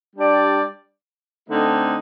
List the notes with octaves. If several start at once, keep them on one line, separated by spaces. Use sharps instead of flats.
G3 D4 G4 D5
D3 A3 C4 D#4